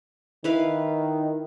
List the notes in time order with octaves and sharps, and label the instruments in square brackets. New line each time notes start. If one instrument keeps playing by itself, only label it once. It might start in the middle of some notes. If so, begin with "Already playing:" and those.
[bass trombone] D#3 [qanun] E4 B4 F5